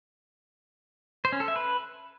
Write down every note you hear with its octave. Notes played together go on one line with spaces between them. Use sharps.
C5
C#4
A4
E5
B4